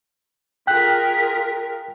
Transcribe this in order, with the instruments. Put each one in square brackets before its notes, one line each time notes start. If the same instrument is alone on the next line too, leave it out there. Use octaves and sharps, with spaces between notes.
[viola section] F4 G#4 A#4 [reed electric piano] G5 F#6 [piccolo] B6